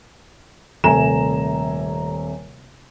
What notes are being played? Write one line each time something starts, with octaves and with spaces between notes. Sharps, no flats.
D#1 C3 A3 G#5 A#5 E7